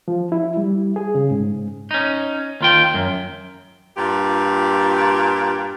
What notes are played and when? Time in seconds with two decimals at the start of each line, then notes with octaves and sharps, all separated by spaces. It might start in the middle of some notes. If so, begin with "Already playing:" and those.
0.08 F3
0.32 E4
0.57 G3
0.96 G#4
1.15 C#3
1.31 G#2
1.91 C#4 D#4
2.61 D#2 F4 G5
2.94 F#2
3.96 G2 A#2 F4 G4